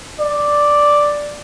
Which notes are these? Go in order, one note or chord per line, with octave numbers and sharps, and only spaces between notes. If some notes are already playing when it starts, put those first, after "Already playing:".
D5